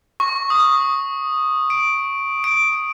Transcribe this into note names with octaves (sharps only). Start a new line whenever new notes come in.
C#6
D#6
D7
D7